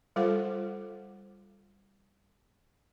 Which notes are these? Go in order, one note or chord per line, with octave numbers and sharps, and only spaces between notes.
G3 F4 A4 C5 F#5